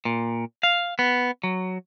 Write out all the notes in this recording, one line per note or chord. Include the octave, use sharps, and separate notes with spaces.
A#2
F5
B3
F#3